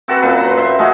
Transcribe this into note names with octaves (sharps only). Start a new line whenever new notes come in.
C4 F#4 A4 B4
F#2 A#2 B4
B4 C5
E5 C6
G#3 A3 C#4 F#4